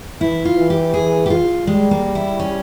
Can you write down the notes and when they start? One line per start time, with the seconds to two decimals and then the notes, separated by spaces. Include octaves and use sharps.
0.20 E3 E4
0.45 F4
0.57 E3
0.70 G4
0.94 G#4
1.26 G4
1.30 F4
1.66 G3 G#3
1.91 A#3
2.15 E4
2.39 C#4